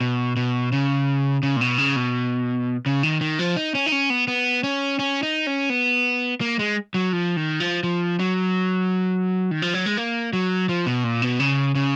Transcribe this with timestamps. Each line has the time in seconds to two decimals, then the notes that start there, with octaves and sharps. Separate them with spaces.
0.01 B2
0.36 B2
0.72 C#3
1.43 C#3
1.56 A#2
1.61 B2
1.78 C#3
1.96 B2
2.86 C#3
3.03 D#3
3.21 D#3
3.39 F3
3.57 D#4
3.75 C#4
3.86 D#4
3.92 C#4
4.10 B3
4.28 B3
4.64 C#4
4.99 C#4
5.23 D#4
5.47 C#4
5.70 B3
6.41 A#3
6.59 G#3
6.94 F#3
7.13 F3
7.37 D#3
7.60 F3
7.83 F3
8.20 F#3
9.51 D#3
9.62 F3
9.74 F#3
9.86 G#3
9.97 A#3
10.33 F#3
10.69 F3
10.86 B2
11.04 A#2
11.22 B2
11.39 C#3
11.75 C#3